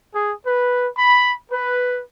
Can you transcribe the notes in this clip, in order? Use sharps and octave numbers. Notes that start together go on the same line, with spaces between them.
G#4
B4
B5
B4